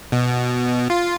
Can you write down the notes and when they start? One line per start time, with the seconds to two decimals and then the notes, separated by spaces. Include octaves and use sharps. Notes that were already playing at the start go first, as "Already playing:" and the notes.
0.12 B2
0.90 F4